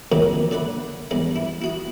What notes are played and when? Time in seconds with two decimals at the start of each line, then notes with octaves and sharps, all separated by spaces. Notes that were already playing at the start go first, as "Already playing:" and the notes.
0.12 F2 A#2 D3 D#3 F#3 G#3
0.51 D3 D5 E5 F#5 B5
1.11 E2 G2 G3 G#3
1.36 E4
1.62 E4 F#4 D#6